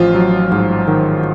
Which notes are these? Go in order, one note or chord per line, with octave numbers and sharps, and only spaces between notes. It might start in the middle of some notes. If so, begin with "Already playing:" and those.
Already playing: A1 F3 F4
F#3
G#2
D#3